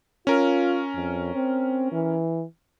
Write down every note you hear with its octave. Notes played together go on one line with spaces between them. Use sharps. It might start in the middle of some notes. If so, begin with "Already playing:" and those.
C#4 F4 A#4
F2
C4
E3